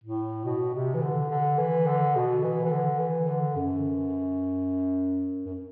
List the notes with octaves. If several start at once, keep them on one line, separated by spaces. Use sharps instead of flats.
A2
B2
C3
E3
D3
D3
E3
D3
B2
E3
E3
D3
E3
D3
F#2
F#2